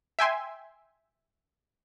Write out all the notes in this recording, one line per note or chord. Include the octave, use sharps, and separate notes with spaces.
E5 G5 G#5 C6